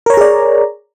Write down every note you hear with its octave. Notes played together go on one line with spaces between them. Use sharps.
G#4 A#4 C#5 D5 A#5